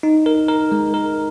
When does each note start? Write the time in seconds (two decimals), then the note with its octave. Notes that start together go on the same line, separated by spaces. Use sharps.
0.03 D#4
0.26 A#4
0.48 A#4
0.72 G#3
0.94 A#4